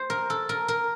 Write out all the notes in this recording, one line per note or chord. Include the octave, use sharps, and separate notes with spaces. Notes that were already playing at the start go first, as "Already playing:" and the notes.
Already playing: C5
A#4
A4
A#4
A#4